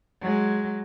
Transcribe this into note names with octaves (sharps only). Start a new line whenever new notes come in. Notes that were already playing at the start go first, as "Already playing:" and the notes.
F#3 G#3